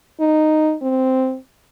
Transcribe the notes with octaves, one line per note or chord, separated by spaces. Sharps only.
D#4
C4